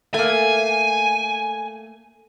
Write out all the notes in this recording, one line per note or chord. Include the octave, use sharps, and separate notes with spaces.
A3 A#3 G#5